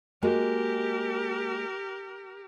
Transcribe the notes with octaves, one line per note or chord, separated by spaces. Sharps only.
G#3 A#3 F#4 G4 A#4